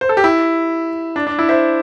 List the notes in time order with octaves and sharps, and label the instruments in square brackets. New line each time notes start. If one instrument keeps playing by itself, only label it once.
[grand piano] C5
A4
G4
E4
D4
D4
E4
C5 E5